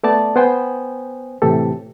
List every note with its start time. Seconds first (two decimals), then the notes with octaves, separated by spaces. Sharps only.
0.03 A3 B3 D5 A5 A6
0.36 B3 C5 G5 G#5
1.42 A2 C3 E3 G4 A4